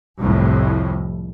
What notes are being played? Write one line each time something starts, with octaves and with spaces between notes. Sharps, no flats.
C2 F2 A2